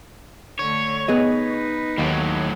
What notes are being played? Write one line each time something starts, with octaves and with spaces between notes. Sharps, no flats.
D3 A3 C#5
B3 D#4 G#4 B4 D#5
D#2 A2 F#3